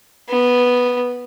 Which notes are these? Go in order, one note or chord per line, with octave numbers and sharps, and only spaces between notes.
B3